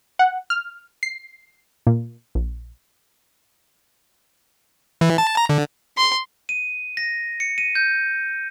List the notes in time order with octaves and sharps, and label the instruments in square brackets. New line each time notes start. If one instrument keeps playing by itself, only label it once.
[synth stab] F#5
F6
C7
A#2
A#1
[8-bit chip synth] E3
A5
A#5
D3
[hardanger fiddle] C6
[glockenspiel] D#7
A#6
C#7
D#7
G6